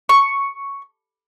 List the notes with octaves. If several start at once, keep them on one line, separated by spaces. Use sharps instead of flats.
C#6